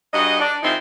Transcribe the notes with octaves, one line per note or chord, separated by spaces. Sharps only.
G2 F#4 G#4 D#5
D4
D#3 F3 G#3 C4 D#4 E4